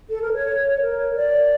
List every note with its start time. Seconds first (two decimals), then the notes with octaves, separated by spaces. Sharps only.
0.09 A4
0.20 A#4
0.33 C#5
0.80 A#4
1.15 D5